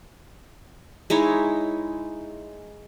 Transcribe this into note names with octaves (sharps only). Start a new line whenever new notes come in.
G#3 D#4 E4 C#5